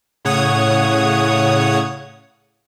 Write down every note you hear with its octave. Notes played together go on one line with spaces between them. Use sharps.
A2 C#3 C#5 F#5 D#6 G#6